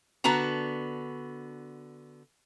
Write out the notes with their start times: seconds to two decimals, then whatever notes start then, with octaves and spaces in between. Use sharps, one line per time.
0.24 D3 B3 F#4 A5 A#5